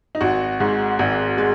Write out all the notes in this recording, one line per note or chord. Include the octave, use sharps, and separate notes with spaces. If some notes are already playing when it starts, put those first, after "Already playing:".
D#4
G#1 F#4
G#2 G#3
G#1
G#3